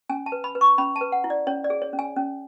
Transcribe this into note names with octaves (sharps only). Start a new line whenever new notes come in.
C#4 G#5
A5
B4
B5
B4
C#6
C#4 B5
A5
B4
F#5
E4
D5
C#4 C#5
D5
G#4
C#5
C#4
G#5
C#4